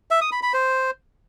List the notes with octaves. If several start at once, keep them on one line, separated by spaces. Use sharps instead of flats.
E5
D#6
B5
B5
C5